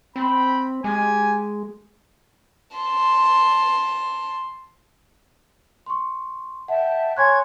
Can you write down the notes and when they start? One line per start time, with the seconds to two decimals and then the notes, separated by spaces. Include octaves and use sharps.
0.16 C4 G5 B5
0.84 G#3 G4 G#5
2.77 A5 C6
5.86 C6 C#6
6.68 E5 F#5 G5 A5
7.17 C#5 G#5 C6 C#6 F#6 G#6